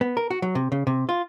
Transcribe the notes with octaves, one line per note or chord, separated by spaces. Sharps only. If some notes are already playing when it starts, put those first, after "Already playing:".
B3
A#4
F#4
F#3
C3
C#3
C3
F4